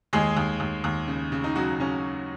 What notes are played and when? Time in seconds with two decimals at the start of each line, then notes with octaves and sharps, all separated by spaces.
0.13 D#2 G#3 G#4
0.37 D#2
0.60 D#2
0.84 D#2
1.08 C#3
1.32 C#3
1.44 D#4
1.55 C#3 F#3 F#4
1.80 C#3 C#4